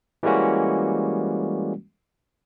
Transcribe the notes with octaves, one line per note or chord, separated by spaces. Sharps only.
E3 G3 G#3 A#3 C#4 F#4